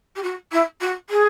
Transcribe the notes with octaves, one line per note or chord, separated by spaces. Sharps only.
G4
F#4
E4
F#4
G#4